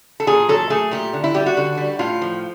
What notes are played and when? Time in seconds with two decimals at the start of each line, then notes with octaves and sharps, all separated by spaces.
0.20 A4
0.27 A#2 G#4
0.49 F#3 A4
0.70 A3 G#4
0.91 A#2 G4
1.13 D3
1.24 E4
1.34 G3 G4
1.46 F#4
1.57 D3
1.77 G3
1.99 A2 F4
2.22 F3